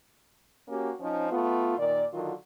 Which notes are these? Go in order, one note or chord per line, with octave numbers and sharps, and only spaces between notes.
A#3 C#4 F#4 G4
F3 C#4 D#4 C5
A3 B3 F4
A#2 D#3 D5
D3 D#3 F#3 F4